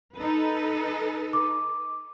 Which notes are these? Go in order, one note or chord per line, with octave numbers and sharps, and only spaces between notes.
D#4 A4 B4
D6